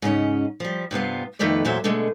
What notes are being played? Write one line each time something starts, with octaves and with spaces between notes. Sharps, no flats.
G#2 C#3 C#4 D#5
F3 G3
G2 C3 B3 F4
F2 D#3 A3 B3 B4 D5
E2 A#2 F#3 C5 E5
B2 D3 G#3 A3